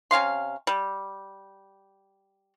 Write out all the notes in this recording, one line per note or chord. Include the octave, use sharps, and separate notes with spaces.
C3 C#4 F5 C6
G3